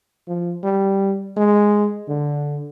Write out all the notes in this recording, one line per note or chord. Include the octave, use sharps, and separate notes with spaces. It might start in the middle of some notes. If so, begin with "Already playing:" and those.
F3
G3
G#3
D3